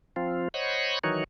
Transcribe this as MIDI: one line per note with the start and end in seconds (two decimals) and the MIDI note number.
0.16 0.48 53
0.16 0.48 60
0.16 0.48 65
0.54 0.99 72
0.54 0.99 73
0.54 0.99 75
0.54 0.99 78
0.54 0.99 83
0.54 0.99 85
1.04 1.24 51
1.04 1.24 52
1.04 1.24 54
1.04 1.24 63
1.04 1.24 66
1.04 1.24 73